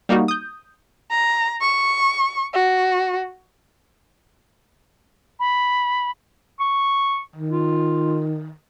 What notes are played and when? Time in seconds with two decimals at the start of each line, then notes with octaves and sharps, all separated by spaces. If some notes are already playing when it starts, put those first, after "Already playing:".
0.09 G3 A#3 D#4 F#4
0.28 D#6 G6
1.11 A#5
1.61 C#6
2.53 F#4
5.40 B5
6.60 C#6
7.36 D#3
7.51 F4